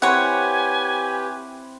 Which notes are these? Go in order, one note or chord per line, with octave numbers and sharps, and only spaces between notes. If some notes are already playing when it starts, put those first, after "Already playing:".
C4 E4 G4 B4 C#5 F#5 G#5